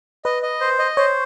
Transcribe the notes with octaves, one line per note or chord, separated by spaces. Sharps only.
B4 D#5
D#5
C5
D#5
C5 C#5